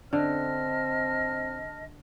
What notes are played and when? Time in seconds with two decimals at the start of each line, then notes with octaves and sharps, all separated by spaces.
0.13 D3 C4 D#5 A5 F6